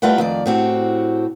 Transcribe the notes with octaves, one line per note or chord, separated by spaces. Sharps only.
G3 A3 F4 B4 F#5 G5
F2 D#3 D5
A2 C4 F#4 G4